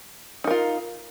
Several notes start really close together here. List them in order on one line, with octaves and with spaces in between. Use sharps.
D#4 A#4 F4